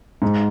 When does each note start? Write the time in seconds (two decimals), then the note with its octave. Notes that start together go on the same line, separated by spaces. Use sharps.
0.22 G#2